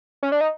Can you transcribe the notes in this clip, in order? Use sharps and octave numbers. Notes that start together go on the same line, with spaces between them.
C#4
D4
D#4